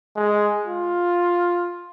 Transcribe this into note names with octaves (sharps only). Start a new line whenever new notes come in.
G#3
F4